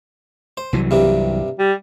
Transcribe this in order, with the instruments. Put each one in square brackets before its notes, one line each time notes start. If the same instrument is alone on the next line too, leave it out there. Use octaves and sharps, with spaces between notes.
[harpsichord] C5
[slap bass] C2 E3 F#3
[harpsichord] G2 C3 G3
[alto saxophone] G3